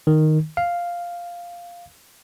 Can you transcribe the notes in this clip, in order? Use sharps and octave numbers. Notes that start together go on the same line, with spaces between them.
D#3
F5